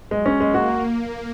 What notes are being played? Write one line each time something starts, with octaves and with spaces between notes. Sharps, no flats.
F#3 G#3
C#4
G#3 A#3
F#4